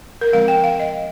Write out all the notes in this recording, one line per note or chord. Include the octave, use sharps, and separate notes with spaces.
A#4
D3 F3 G#3 C4 F5
G5
F5
D#5